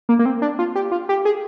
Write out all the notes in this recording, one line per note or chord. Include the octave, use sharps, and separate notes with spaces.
A#3
A#3
C4
D4
F4
G4
F4
G4
G#4